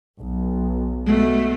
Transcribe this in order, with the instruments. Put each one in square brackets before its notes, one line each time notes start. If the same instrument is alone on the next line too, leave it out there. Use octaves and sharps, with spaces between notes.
[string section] B1
[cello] B2 A3